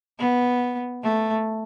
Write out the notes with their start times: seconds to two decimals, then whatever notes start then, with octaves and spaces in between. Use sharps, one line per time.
0.19 B3
1.03 A3